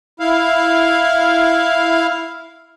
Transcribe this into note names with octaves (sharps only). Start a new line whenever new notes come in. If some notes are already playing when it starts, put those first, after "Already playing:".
E4 F5